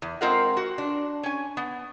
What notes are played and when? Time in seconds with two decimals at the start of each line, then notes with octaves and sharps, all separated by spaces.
0.02 E2
0.21 G#3 C4 F4 A#4 F5 F#5
0.57 F#4
0.78 D4
1.23 C#4 G#5
1.57 B3